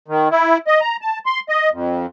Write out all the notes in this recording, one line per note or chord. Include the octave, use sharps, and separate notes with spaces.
D#3
E4
D#5
A#5
A5
C6
D#5
F2